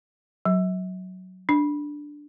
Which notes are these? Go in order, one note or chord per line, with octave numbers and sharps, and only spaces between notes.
F#3
D4